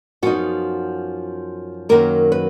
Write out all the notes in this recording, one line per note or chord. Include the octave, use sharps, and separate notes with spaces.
F#2 F3 B3 D#4 F#4
F#2 D#3 F#3 A#3 A#4
B4